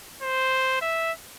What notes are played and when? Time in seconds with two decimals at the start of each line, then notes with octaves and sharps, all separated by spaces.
0.23 C5
0.81 E5